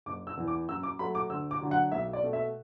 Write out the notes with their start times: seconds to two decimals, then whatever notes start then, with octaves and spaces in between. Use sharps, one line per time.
0.06 F#1 D6
0.27 E6
0.37 E2 E3
0.48 D6
0.68 F#2 E6
0.83 D6
0.99 F#3 A3 B5
1.15 D6
1.30 D2 E6
1.51 D6
1.61 D3 F#3
1.71 F#5
1.92 B1 E5
2.13 D5
2.23 B2 A3
2.33 E5